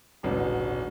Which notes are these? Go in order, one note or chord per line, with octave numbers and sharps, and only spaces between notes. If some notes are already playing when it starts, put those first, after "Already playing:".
D#1 A1 G#2 B2 D3